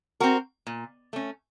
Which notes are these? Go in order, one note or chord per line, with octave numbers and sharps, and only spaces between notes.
C4 F#4 A#4
A#2
A3 C#4